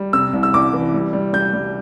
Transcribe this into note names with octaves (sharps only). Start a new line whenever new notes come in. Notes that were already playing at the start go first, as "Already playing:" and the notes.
Already playing: G3
C3 E6
C2
E6
C2 D6
E3
G3
G3
G3 G6
G3